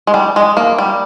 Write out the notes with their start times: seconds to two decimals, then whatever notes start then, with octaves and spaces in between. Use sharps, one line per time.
0.07 G#3
0.14 G3
0.36 G#3
0.57 A#3
0.78 G3